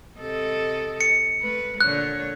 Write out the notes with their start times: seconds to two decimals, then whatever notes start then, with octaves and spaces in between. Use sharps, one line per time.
0.19 C3 A4 D#5
1.01 C#7
1.41 A3 B4
1.81 A#2 D3 C#5 F#6